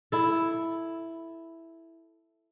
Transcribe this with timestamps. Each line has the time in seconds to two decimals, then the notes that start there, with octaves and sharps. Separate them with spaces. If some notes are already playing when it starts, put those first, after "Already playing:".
0.12 E4 A4